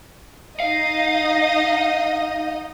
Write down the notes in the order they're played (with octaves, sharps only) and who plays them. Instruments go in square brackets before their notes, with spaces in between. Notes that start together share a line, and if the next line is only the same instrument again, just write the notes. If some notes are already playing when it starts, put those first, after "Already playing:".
[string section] D#4 D#5 [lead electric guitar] F5